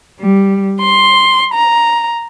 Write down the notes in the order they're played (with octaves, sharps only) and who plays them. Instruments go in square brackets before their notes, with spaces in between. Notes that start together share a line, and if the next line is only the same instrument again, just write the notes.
[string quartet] G3
C6
A#5